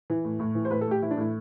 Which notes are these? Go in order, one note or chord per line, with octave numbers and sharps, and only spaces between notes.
E3
A2
A2
E3
C5
A2 B4
A4
A2 G4
E3 E4
D4
A2 E4